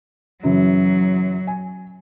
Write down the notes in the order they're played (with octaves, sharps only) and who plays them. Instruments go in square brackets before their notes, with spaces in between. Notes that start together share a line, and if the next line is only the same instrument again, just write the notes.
[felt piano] F#2 C#3 E3 [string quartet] F#3
[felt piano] G#5